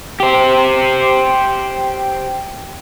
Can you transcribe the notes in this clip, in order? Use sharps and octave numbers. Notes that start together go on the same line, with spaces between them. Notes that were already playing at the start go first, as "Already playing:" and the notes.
G4 C5